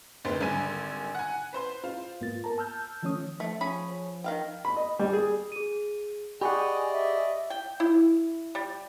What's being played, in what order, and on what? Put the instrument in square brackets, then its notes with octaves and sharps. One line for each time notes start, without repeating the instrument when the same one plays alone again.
[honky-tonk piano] F#1 D2 B3 C4 C6
G#1 D3 G3 G#5 D#7
F#5 G#5
B4 C5 C6
F4 C5
[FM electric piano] G#2 A#3 B3 F4 A6
A#4 A5 A#5
A5 E6 F6 G6
D#3 F3 A3 C#4 C#5 D#6
[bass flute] F3 [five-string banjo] A3
[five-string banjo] C#4 G#4 B5
D#3 F5 G5
[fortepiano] B5
D#5
G3
G#4
[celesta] G#4 D#7
[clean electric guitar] G4 G#4 F#5 [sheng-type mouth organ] D5 D#5 [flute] G#5 [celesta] B5 C#6
[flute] E5
[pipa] G5
E4
G3